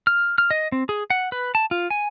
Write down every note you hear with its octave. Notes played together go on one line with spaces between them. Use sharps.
F6
F6
D#5
C4
G#4
F#5
B4
A5
F4
G#5